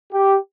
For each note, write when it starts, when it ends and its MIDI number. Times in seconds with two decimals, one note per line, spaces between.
0.13 0.36 67